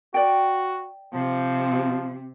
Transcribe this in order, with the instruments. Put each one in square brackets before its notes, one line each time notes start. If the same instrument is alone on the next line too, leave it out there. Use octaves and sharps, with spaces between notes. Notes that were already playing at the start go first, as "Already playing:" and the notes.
[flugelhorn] F#4 [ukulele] D5 G5
[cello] C3 [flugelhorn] F3